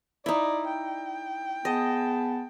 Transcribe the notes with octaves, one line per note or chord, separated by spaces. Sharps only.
D#4 E4 D5
G5
B3 G#4 D#5 A5